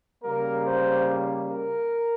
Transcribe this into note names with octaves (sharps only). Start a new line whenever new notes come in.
C#3 G3 A#3 A#4
C5
A#4